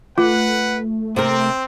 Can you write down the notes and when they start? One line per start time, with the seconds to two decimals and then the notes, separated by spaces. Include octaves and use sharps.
0.18 A3 F4 B4 F#5
1.16 C3 C4 A#4